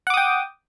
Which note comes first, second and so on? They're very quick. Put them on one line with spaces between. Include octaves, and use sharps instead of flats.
F#5 D6 D#6 G5